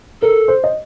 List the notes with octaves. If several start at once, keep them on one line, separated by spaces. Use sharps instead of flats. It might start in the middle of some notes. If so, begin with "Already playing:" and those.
A4 A#4
C5
D#5